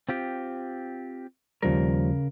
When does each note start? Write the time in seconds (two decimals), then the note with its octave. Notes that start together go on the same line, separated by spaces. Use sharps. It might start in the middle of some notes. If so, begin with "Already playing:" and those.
0.09 C4 F4 G4
1.62 D#2 C#3 F3 G3 A#4